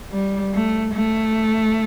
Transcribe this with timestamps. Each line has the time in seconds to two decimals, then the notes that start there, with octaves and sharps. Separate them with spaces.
0.12 G3
0.54 A3
0.94 A3